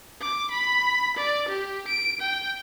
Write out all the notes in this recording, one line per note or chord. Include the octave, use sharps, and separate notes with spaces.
D6
B5
D5
G4
D7
G5